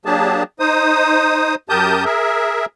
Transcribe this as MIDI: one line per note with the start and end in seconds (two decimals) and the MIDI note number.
0.05 0.43 54
0.05 0.43 58
0.05 0.43 62
0.05 0.43 67
0.05 0.43 68
0.05 0.43 81
0.60 1.55 63
0.60 1.55 72
0.60 1.55 87
1.69 2.04 42
1.69 2.04 67
1.69 2.04 70
1.69 2.04 81
1.69 2.04 87
1.69 2.04 91
2.05 2.66 68
2.05 2.66 70
2.05 2.66 76